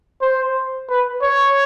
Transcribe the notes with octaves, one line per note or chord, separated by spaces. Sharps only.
C5
B4
C#5